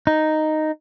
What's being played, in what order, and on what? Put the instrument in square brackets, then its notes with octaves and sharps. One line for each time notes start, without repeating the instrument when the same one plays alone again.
[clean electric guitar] D#4